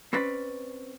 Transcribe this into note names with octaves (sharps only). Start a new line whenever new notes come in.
C4 C#4 B4 D5